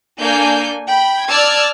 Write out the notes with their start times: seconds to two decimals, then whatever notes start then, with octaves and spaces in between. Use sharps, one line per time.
0.20 A#3 D4 A4 G#5 G6
0.86 G5 B5
1.27 D5 A5 D6 E6 F6 G#6